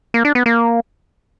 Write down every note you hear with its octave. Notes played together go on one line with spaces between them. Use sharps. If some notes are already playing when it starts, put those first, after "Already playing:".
A#3
D4
B3
A#3